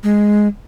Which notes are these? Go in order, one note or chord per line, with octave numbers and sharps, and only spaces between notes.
G#3